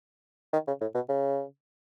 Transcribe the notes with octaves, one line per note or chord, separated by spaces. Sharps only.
D#3
C#3
A2
B2
C#3